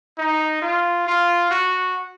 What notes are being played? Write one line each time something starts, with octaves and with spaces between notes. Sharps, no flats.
D#4
F4
F4
F#4